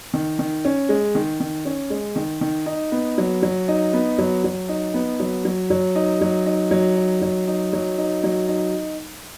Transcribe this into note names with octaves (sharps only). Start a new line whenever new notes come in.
D#3
D#3
C#4
G#3
D#3
D#3
C#4
G#3
D#3
D#3
D#4
B3
F#3
F#3
D#4
B3
F#3
F#3
D#4
B3
F#3
F#3
F#3
D#4
F#3
D#4
F#3
D#4
F#3
D#4
F#3
D#4
F#3
D#4